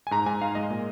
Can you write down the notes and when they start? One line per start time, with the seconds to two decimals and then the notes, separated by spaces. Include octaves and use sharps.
0.07 G#5
0.11 G#2 A#5
0.26 G#2 G#5
0.41 G#2 F5
0.55 G#3 D#5
0.70 A#2